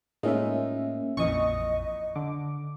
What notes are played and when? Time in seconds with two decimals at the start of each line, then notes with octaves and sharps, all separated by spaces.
0.23 A2 G#3 A#3 C#4 D#4 F4 E5
1.17 A#1 F2 A#2 E3 D#5 C#6 D#6
2.16 D3 D6